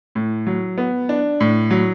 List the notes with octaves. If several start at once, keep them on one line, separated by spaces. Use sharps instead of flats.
A2
F#3
B3
D4
A2
F#3